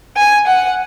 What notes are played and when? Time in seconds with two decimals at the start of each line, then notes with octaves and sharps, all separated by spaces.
0.17 G#5
0.47 F#5